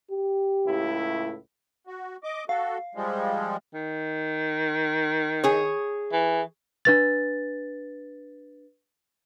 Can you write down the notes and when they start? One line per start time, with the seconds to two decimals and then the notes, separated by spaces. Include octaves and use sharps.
0.11 G4
0.66 C#2 A2 E4
1.87 F#4
2.23 D#5 D6
2.49 F#4 A4 F5
2.95 F3 G3 G#3
3.74 D#3
5.44 G#4 C#5
6.12 E3
6.85 D4 B4 A6